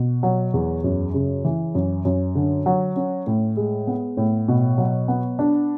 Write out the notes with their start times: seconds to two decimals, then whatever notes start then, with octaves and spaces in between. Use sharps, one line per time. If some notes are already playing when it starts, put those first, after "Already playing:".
Already playing: B2
0.23 F#3
0.54 E2
0.84 F#2
1.14 C#3
1.45 E3
1.75 F#2
2.05 F#2
2.35 D3
2.66 F#3
2.96 C#4
3.27 A2
3.57 G#3
3.87 B3
4.17 A2
4.48 B2
4.78 F#3
5.08 B3
5.39 D4